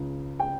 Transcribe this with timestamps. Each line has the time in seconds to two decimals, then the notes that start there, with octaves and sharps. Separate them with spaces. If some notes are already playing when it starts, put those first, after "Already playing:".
Already playing: C#2 C#3
0.40 G5